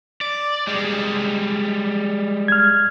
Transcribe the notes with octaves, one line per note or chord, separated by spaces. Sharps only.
D5
G3 G#3
F6 G#6